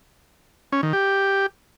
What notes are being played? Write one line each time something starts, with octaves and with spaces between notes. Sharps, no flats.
C#4
D#3
G4